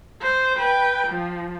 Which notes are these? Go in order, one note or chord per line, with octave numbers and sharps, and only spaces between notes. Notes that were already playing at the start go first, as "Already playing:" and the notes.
C5
B4 G5
F3